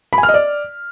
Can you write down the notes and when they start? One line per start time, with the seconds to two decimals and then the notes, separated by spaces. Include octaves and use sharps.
0.13 B5
0.18 G#5
0.23 F6
0.29 D#5
0.34 D5